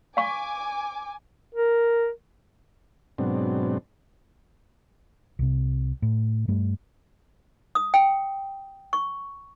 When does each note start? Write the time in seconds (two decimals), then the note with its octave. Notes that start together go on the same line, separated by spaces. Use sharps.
0.17 F5 G#5 C#6 D6
1.55 A#4
3.18 G#2 B2 F#3 C4 D4
5.39 C2 C3
6.02 A2
6.48 G2 G3 A3
7.75 D#6
7.94 G5
8.93 C#6